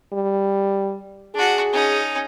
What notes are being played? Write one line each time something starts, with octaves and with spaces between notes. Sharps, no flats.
G3
D4 F#4 G#4
C#4 D#4